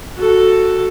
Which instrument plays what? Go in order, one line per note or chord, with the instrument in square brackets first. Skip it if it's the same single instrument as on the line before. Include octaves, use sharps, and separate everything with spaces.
[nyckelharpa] F#4 A4